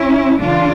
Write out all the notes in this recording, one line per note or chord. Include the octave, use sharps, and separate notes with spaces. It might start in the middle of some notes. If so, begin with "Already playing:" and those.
Already playing: C#4 E4
C#3 E3 D4 F4